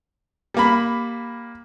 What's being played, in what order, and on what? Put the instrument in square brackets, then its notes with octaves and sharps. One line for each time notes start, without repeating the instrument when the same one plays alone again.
[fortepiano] G3 A#3 B5